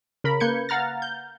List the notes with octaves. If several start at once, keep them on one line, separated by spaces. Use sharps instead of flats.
C#3 A#4 B5
A#3 B4 G6 G#6 C#7
F5 F#5 A#5 F6 A6
G6